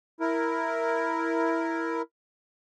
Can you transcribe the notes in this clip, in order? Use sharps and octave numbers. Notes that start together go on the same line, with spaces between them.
E4 A#4